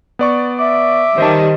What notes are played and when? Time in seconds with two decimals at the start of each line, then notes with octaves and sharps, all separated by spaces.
0.19 B3 D5 C#6
0.59 E5 D6
1.18 D#3 G3 C5 D#5 A5